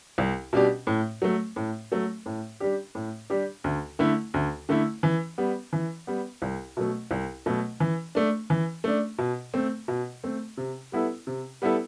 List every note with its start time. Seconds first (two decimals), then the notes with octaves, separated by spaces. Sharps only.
0.18 C2
0.53 B2 G3 D4 G4
0.87 A2
1.22 F#3 A3
1.56 A2
1.92 F#3 A3
2.26 A2
2.60 G3 D4 G4
2.95 A2
3.30 G3 D4 G4
3.64 D2
3.99 D3 A3 E4
4.34 D2
4.69 D3 A3 E4
5.03 E3
5.38 G3 B3
5.73 E3
6.07 G3 B3
6.42 C2
6.77 B2 F#3 A3
7.11 C2
7.46 B2 F#3 A3
7.80 E3
8.15 A3 D4
8.50 E3
8.84 A3 D4
9.18 B2
9.54 A3 C4
9.88 B2
10.24 A3 C4
10.57 C3
10.92 G3 B3 E4 A4
11.27 C3
11.62 G3 B3 E4 A4